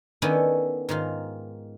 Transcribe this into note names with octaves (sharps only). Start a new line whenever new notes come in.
D#3 B3 C#4 D4 E4 A4
G#2 D#3 F4